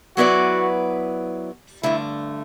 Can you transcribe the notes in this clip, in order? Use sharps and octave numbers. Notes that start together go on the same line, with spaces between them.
F#3 B3 E4 F#4 B4 D5
G2 D3 A3 E4